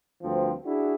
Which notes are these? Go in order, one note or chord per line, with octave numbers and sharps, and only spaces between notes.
D2 G2 F3 C4
D4 E4 F#4 G#4